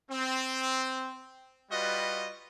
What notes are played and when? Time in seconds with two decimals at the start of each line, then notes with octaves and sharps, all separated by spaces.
0.10 C4
1.70 G3 F4 F#4 B4 D#5